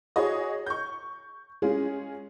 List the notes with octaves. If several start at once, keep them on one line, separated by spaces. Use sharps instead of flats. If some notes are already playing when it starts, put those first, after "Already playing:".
F#4 G#4 C#5 D#5
C#6 G6
G#3 C#4 F4 G#4